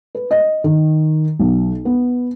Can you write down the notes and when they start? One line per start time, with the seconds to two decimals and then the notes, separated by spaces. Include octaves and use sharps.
0.15 B4
0.31 D#5
0.64 D#3
1.39 B1
1.85 B3